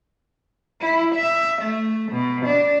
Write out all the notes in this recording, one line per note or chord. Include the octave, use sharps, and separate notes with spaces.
E4
E5
A3
B2
D4